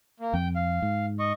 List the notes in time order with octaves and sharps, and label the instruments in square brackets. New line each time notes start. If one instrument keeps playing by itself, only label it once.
[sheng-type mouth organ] A#3
[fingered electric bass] F2 [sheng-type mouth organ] G5
[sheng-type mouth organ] F5
[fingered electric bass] G#2
[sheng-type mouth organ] D#5 C#6